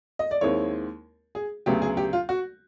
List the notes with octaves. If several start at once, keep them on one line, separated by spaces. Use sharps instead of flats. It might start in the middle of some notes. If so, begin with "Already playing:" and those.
D#5
D5
D#2 D#3 G#3 C4 E4 C#5
G#4
D2 C#3 F#3 B3 G4
G#4
G4
F4
F#4